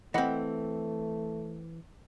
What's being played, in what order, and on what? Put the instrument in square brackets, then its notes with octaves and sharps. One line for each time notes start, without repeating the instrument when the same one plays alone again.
[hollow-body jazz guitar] E3 C4 [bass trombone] A3 [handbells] D#5 F#5 B5